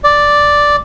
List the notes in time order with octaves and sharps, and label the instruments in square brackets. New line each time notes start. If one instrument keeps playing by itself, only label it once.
[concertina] D5